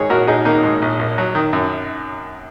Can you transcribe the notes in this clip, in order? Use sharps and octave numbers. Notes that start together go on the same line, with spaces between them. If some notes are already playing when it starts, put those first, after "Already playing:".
Already playing: G#2 D#3 G#4 C#5
A#1 F#4 A#4
A#1 D#4 G#4
D#3 A#3 D#4
G#2
A#1
A#1
F#3
D#3
F#2